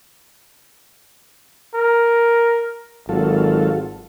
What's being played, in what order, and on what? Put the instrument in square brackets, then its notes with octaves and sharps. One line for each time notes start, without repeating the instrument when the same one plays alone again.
[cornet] A#4
[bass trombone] G#1 [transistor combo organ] F#3 F4 A4